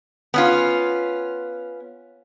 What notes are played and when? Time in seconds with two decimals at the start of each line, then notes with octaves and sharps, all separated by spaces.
0.34 B3 C#4 F4